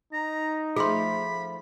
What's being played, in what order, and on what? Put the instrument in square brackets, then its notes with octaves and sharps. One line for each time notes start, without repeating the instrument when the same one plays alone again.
[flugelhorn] D#4 [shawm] A#5
[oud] F3 A3 C4 [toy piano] G#4 C6 [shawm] B5